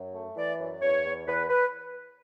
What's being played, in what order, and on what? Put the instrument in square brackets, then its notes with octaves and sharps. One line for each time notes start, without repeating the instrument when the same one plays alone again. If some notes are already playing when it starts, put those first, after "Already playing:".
Already playing: [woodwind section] F#2
A3
E3 D5
F#2
E2 C#5
E2
E2 B4
B4